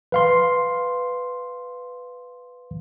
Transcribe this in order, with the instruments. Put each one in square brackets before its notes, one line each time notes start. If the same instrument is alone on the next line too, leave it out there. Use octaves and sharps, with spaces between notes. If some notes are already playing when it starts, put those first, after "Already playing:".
[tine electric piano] B4 F5 C6